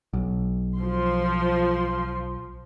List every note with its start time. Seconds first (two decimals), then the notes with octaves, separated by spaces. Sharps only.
0.13 B1
0.78 F3 C6